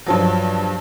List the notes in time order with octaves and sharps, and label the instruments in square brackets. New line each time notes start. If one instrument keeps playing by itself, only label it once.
[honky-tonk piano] G2 F3 F#3